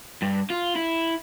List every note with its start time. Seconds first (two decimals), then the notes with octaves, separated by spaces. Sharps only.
0.22 G2
0.50 F4
0.75 E4